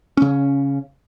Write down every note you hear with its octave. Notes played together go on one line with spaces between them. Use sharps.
C#3 C#4